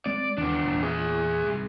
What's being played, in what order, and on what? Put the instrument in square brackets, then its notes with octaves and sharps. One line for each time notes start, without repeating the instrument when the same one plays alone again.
[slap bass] G#3 C4 [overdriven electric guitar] D5
[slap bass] D#2 C#3 E3 [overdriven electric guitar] B3 D4
[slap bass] E1 E2 A#2
[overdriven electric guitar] G#4 E5
[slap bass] C2 G#2 B2